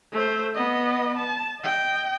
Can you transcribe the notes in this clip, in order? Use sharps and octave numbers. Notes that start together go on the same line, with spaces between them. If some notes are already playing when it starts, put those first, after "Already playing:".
A3 C5
B3 D#5
A5
D#5 G5